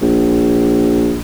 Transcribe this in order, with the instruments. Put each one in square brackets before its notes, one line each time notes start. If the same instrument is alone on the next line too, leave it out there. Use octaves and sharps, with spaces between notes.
[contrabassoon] A#1